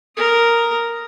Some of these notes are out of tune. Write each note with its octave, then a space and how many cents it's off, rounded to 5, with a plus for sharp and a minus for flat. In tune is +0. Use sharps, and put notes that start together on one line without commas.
A#4 +0 D#6 +0